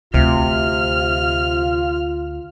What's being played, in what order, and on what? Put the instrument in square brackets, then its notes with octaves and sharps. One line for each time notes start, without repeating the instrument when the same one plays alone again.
[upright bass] D2 [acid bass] C3 [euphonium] F4 [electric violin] F6